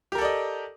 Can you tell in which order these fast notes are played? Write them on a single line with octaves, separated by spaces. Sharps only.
G4 A#4 A4 D5 D#5